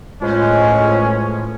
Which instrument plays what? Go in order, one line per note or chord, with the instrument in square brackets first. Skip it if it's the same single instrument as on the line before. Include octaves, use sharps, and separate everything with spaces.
[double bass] A2 [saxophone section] G#3 [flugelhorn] C#4 [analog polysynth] F4 B4 C5